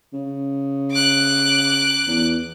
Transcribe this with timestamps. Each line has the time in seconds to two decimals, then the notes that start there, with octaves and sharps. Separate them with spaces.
0.13 C#3
0.91 D6 F#6
2.07 E2